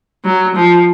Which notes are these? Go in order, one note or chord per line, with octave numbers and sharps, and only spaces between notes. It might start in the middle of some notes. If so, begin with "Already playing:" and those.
F#3
F3